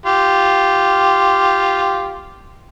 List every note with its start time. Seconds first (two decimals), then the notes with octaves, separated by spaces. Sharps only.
0.06 F4 G4